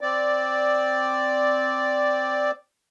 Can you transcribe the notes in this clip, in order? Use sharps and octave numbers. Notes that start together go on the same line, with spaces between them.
C4 D5